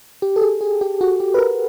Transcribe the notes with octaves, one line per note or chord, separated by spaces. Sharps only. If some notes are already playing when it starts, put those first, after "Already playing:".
G4
A4
G#4
G#4
G4
F#4
G4
B4
A#4